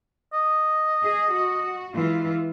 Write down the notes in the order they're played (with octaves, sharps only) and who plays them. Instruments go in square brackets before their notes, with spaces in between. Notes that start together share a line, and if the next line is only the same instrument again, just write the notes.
[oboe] D#5
[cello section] G#4
F#4
E3 G#3 F4